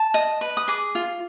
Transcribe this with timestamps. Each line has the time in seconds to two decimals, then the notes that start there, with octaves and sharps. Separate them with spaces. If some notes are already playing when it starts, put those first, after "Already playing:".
Already playing: A5
0.14 D#5
0.41 B4
0.57 D#6
0.68 G#4 D6
0.95 F4